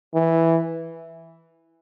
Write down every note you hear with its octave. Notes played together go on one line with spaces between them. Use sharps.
E3